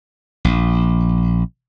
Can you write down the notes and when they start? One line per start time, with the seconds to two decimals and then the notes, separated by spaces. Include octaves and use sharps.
0.45 A#1